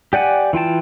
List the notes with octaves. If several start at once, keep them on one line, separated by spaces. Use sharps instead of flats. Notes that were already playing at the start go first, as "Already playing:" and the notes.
G4 D5 F#5 G#5
E3 F4 G5 A5